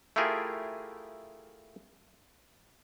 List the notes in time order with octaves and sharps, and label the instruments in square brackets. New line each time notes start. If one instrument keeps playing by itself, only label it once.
[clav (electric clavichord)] A3 E4 F4 G4 G#4 A#4